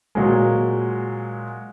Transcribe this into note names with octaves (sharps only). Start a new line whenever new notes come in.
A#2 F#3 G#3